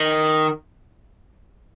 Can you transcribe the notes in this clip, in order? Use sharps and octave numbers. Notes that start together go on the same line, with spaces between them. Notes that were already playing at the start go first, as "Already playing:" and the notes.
Already playing: D#3